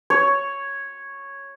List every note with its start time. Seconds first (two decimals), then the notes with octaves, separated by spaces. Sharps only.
0.10 C#5